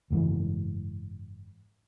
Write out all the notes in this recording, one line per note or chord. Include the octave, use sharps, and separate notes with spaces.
F#1 G#2 B2 E3